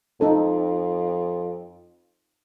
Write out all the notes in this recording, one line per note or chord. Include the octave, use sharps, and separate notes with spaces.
F2 D#4 A4